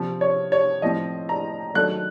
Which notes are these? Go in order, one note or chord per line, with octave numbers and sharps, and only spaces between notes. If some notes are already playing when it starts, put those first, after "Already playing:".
Already playing: C3 F3 C4
C#5
C#5
A2 F3 C4 D#5
A#5
D#3 F#3 A3 F#6